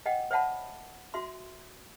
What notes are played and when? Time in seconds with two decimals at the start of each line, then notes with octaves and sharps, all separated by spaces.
0.06 D#5 F#5 G5
0.31 C5 C#5 E5 F#5 A5 B5
1.14 F#4 E5 C6